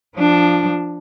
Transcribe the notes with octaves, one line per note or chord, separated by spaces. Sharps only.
F3 D4